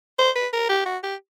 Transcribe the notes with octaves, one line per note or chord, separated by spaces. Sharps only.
C5
B4
A#4
G4
F#4
G4